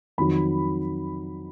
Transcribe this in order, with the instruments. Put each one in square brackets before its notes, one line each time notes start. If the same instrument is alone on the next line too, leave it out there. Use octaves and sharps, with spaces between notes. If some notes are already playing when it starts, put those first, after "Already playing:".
[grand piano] F2 D#3 F#3 B5